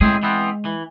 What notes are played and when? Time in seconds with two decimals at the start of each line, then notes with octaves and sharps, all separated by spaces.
0.01 A2 G#3 C4 G#4
0.23 E3 B3 C4
0.65 E3